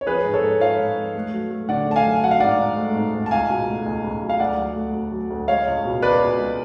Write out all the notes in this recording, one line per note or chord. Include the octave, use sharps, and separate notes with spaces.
C#5
F3 G#4 B4
G#2
A4 C#5
G#2
F3 C#5 F5
G#2
G#3
A3
F#3
A3
D3 D5 F#5
A3 A5
F5 G#5
F#2
F#3 F#5
F5
G#2 D5 F#5
G#2
A3
G#2
G#2
A5
C#2 F5 G#5
B2
A3
C#2
C#2
F#3
F5
D2 D5 F#5
F#3
A3
D2
F#3
D2
G#3 C#5 F5
C#2
B2
C#2 B4 D5
B2
G#3